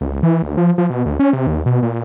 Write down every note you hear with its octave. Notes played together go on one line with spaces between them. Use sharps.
C#2
E3
D2
F3
F3
B2
D2
C#4
C3
D#2
B2
A#2